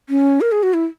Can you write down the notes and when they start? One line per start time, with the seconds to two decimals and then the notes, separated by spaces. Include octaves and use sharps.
0.09 C#4
0.41 A#4
0.52 G#4
0.63 F#4
0.74 E4